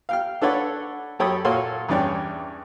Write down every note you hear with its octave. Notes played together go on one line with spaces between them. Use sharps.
F5 G5 F6
D4 A4 B4 C#5 D5 F#5
F#2 G4 A4 C#5 B5 D#6
A#2 F#4 A4 C#5 F5 C6
E2 G2 C#4 D5 G5